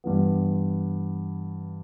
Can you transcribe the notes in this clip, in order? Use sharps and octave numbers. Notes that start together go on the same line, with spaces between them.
G2 E3 B3